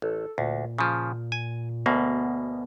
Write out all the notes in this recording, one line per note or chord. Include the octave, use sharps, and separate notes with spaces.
A1 A4
D2 A#2
C#3 F3
G#5
D2 B2 A#3 B3